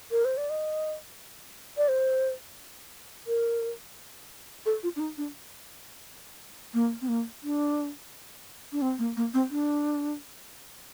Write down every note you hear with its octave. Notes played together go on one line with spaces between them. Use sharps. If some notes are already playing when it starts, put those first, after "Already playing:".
A#4
C5
D5
D#5
D5
C5
A#4
A4
F4
D4
D#4
D4
A#3
C4
A#3
D4
D4
C4
A#3
A#3
C4
D4